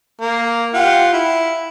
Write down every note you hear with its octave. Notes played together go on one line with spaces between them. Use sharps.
A#3
F4 G4 F#5
E4